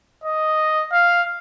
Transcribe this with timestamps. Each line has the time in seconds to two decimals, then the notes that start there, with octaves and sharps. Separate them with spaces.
0.24 D#5
0.92 F5